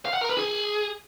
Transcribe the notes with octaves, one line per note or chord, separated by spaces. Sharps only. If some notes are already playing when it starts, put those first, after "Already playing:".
F5
F#5
A#4
B4
G#4